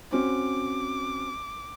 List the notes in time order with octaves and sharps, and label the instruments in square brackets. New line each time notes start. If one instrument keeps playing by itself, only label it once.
[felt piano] C4 C#4 F#4 [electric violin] D6